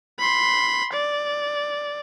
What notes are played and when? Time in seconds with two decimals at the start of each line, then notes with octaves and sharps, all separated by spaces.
0.19 B5 C6
0.93 D5